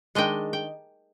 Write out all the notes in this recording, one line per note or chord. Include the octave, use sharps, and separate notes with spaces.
D#3 G#3 D4 D#5 G5
G5